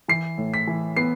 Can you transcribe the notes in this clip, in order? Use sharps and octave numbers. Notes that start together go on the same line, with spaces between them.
E3 C7
A2
B6
E3
B3 C7